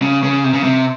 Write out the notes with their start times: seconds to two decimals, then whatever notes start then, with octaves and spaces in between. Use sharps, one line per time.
0.02 C#3
0.23 C#3
0.44 C3
0.54 C#3
0.64 C3